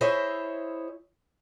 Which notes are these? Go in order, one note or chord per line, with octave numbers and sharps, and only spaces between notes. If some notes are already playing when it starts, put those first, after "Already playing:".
E4 G#4 C5 C#5 D#5 E5